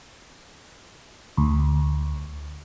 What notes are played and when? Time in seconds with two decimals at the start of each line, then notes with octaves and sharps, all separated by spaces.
1.37 D2